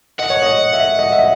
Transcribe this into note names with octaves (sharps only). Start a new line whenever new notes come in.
D#5 F#5
C#5
D#5
E5
D#5
D#5
E5
D#5